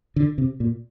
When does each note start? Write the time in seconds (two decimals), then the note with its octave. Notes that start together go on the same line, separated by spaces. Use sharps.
0.16 D3
0.38 C3
0.60 A#2